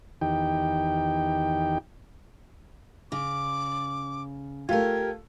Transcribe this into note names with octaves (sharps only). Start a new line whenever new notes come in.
E2 D#3 D#4 G4 G5
C#3 D6
A3 F4 G4 A#4 G#6